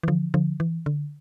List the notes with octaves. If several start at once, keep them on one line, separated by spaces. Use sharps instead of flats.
E3
D3 F3
D3 F3
E3
D3